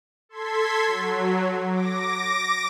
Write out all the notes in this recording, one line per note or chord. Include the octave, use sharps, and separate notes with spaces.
A4 C6 G#6 B6
F#3
D6 A#6